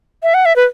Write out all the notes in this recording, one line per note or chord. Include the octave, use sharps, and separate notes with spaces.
E5
F#5
E5
B4